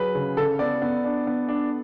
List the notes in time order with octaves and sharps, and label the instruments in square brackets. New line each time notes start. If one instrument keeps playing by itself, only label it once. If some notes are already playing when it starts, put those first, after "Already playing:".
Already playing: [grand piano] F#3 [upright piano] G#4 B4
[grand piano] C#3
[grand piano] C#3 [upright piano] A4
[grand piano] B3 [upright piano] D5
[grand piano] B3
D4
B3
D4